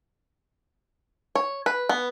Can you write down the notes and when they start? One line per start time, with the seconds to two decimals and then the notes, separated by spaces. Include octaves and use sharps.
1.35 C#5
1.66 B4
1.89 B3